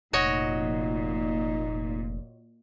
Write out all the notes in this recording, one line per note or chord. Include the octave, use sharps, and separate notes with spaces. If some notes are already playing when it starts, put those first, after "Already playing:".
F1 A#2 D#4 F#4 C#5 D#5